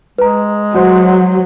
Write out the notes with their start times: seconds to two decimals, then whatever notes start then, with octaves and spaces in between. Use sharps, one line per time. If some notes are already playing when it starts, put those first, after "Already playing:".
0.18 G#3 B4 A#5
0.74 F#3 F#4 C5